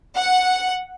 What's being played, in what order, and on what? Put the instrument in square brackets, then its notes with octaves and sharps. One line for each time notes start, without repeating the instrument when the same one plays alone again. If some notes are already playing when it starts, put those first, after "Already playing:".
[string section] F#5